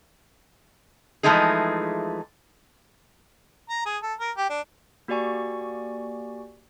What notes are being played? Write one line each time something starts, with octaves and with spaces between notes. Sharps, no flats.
E3 F3 G#3 A3 D#4 G#4
A#5
G#4
A4
A#4
G4
D4
A#3 F#4 G4 D5 G#5 C#6